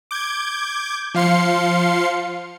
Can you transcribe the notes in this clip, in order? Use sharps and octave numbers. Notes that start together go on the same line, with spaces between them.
D6 G6 G#6
F3 F5 C6 C#7